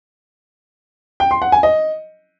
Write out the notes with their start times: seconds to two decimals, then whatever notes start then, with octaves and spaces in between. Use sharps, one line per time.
1.20 G5
1.31 C6
1.42 F#5
1.52 G#5
1.63 D#5